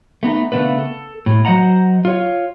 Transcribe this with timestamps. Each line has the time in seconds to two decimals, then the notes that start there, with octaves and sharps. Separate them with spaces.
0.23 A3 B3 D#4
0.52 C#3 A3 B3 D4 B4
0.79 A4
1.26 A2
1.45 F#3 C5 D#5 F#5 A#5
2.05 F4 C#5